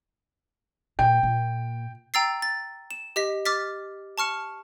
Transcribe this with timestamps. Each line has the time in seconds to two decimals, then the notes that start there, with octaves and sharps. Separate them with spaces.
0.99 A#2 G5
1.23 A#2
2.14 G5 A#5 E6 A6 C7
2.42 A6
2.91 E7
3.16 G4 D#5 B6
3.45 D6 F6 A6 B6
4.18 A5 C#6 F6 C#7